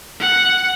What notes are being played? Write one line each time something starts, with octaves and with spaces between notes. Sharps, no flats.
F#5